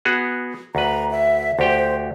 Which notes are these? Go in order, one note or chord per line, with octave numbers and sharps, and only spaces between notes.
B3 F#4 G#4
D2 B4 A#5
E5
D2 G4 C5 G5